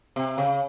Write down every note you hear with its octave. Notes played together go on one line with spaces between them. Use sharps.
C3
C#3